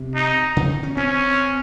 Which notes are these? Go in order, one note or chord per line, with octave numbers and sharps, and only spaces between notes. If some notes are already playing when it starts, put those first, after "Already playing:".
Already playing: C3
D#4
C#3
D#3
C#4
C4 C#4